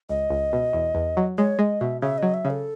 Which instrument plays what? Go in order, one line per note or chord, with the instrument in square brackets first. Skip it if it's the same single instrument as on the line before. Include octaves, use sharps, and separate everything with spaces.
[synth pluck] C#2 [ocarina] D#5
[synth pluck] C#2
B2
E2
E2
F#3
[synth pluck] G#3 [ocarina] C#5
[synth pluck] G#3 [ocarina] D#5
[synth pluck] B2 [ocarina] E5
[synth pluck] C#3 [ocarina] E5
[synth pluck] F#3 [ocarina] D#5
[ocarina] E5
[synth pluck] C#3
[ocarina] A4